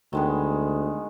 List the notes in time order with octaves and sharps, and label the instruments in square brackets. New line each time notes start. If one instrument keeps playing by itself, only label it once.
[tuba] D2 [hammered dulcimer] D#3 G#3 B3